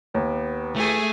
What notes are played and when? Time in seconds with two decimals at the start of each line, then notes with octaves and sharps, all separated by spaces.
0.15 D#2 B3
0.76 E3 A3 G#4 G#5